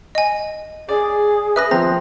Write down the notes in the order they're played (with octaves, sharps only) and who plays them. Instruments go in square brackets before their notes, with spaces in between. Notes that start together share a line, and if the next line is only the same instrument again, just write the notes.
[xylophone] D#5 G#5
[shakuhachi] G#4 [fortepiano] D5
[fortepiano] B4 D#6 [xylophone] E5 F#6 A#6
[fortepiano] F3 [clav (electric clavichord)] C4 [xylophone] A#5